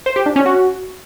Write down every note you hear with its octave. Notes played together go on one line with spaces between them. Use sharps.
C5
G4
D4
C#4
F#4